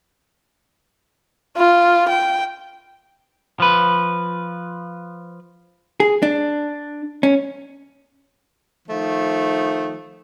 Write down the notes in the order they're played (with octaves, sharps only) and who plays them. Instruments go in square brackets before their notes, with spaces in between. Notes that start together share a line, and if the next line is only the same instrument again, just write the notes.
[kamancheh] F4
G5
[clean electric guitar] F3 B4
[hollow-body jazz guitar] G#4
D4
C#4
[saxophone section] D#3 F3 A3